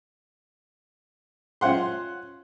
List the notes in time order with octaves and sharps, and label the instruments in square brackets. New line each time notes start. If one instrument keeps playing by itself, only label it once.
[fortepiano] C#4 F4 C5 F#5 C6